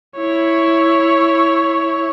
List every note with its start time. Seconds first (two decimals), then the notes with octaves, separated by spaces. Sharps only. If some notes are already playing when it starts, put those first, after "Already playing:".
0.17 E4 C#5